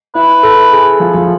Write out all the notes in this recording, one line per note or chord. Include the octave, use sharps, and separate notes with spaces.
E4 B4
A4
G#4
F3
F3